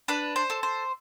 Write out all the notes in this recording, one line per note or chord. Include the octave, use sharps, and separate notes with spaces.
D4 B4
C5
A4
C5